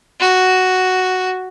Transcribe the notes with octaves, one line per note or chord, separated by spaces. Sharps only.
F#4